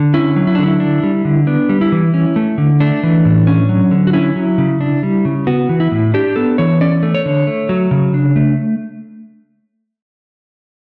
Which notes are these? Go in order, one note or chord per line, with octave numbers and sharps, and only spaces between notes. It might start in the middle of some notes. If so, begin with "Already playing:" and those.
Already playing: D3
C#4 E4
F#3
E4
D4
D3 E4
D4
G3
D3
B3 D4
G3
E4
E3
C#4
A3
D3
A3 D4
E3
A2
C#4
F#3
D3
F#4
C#4 E4
F#3
C#3
D4
G3
C#3
B3 F#4
E3
E4
A2
D4 G4
B3 A4
E3 C#5
C#4 D5
A3
C#5
D3
A3
F#3
C#3
D4
A3